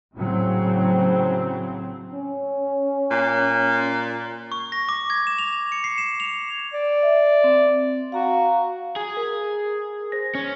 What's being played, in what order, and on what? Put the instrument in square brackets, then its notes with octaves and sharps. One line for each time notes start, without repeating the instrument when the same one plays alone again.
[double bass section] A2 C#3 F#3 C4
[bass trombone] C#4
[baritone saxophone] A#2
[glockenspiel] C#6
A#6
D6
G#6
E7
F7
C#7
C7
E7
F7
[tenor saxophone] D5
[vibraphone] E5
C4
[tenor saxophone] F#4 [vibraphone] F5 A#5
[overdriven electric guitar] G#4
[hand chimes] A#4
C5 A#6
[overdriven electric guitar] C#4